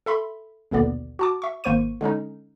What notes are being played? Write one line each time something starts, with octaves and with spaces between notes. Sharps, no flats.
A4 E5 B5 C6
A#1 D#2 B2 D3 B3 D5
F#4 A5 D6
E5 C#6
G#1 A#3 C5 C#6 D#7
D3 G#3 C#4 D#4